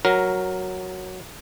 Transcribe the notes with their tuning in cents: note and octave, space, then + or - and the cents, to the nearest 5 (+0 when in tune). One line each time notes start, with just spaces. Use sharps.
F#3 +0 A#4 +10